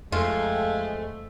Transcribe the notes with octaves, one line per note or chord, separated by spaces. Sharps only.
F2 G#3 A3 F4